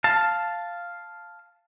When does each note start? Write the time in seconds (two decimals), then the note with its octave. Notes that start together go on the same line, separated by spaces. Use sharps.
0.04 F5 A5